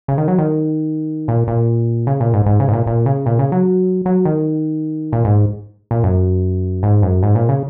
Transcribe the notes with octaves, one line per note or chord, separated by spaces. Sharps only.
C#3
D#3
F#3
D#3
A#2
A#2
C#3
A#2
G#2
G#2
C#3
G#2
A#2
A#2
C#3
A#2
C#3
F#3
F#3
D#3
A#2
G#2
A#2
F#2
G#2
F#2
G#2
A#2
C#3